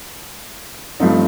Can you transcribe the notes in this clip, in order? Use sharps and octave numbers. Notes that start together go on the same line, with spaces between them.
G2 F3 A3 C4 D#4